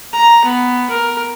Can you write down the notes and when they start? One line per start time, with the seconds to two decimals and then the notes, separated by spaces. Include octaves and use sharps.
0.13 A#5
0.45 B3
0.90 A#4